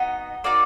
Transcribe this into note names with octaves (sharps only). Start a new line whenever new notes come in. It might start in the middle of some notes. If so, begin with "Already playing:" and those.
Already playing: B3 D#4 F#4 D#5
A#3 D#4 F#4 D5